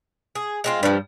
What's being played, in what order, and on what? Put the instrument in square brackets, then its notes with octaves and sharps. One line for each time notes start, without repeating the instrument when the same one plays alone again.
[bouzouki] G#4
G#3 C4 F4
[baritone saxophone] G2 [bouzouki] F3 G3